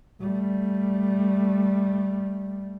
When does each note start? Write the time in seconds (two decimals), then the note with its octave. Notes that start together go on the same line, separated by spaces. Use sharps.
0.20 G3 A3